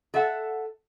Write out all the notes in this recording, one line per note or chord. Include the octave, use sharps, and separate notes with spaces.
A4 E5 F#5